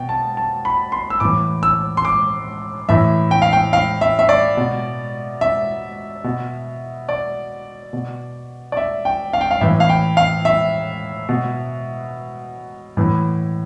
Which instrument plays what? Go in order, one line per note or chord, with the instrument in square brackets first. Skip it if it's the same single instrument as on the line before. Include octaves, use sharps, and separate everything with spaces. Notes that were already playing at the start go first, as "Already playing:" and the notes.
Already playing: [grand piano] B2 G5
A5
A5
B5
C6
E6
A2 E3 D6
E6
C6
D6
A2 E3 E5
G5
F5
G5
F5
E5
E5
D5
B2
E5
B2
D5
B2
D5
E5
G5
F5
G5
F5
A2 E3 E5
F5
G5
F5
E5
B2
A2 E3